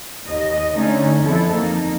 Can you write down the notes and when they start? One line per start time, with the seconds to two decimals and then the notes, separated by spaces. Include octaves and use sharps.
0.25 D#2 D#5
0.75 D3 A3 C#4 D#4
1.20 F2 E3 F3 B3 E4 A4
1.53 F2 A#3 D#4